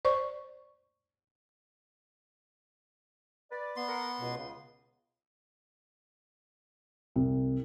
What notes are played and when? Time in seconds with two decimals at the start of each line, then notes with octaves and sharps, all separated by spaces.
0.05 C5 D5 C#6
3.52 B4 D5
3.76 B3 C6
3.89 A#4 F#5
4.20 C#2 B2
4.38 C#2 C#3
7.16 C2